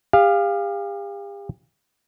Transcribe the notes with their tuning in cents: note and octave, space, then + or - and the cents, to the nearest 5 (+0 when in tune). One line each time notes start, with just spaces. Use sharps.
G4 +40 F5 +0